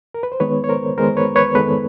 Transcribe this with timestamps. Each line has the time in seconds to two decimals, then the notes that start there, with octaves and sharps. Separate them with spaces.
0.14 A#4
0.23 B4
0.32 C5
0.40 D#3 G#3 B3 B4 C#5
0.64 C#5
0.69 A#4 C5
0.97 D#3 G#3 B3 A#4 C5
1.17 B4 C#5
1.36 B4 C#5
1.55 D#3 G#3 B3 A4 B4